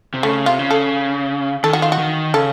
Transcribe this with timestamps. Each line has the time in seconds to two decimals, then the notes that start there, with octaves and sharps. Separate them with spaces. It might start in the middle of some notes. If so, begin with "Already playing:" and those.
0.14 C3
0.23 C#3 A3
0.46 C3 F4
0.59 C#3
0.71 A4
1.64 D#3 A4
1.73 F#4
1.82 F4
1.92 F#4
1.99 D#3
2.34 C#3 A4